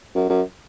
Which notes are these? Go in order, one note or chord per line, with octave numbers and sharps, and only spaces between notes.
F#2
F#2